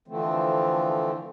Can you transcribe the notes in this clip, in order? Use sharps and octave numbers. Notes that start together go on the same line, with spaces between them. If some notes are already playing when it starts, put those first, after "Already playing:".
D3 E3 F3 A3 C4